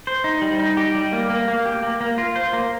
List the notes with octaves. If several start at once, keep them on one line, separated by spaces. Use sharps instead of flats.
C5
D#4
G3
D#4
G4
G3
A#3
A#3
A#3
G4
A#3
A#3
F4
C5
A#3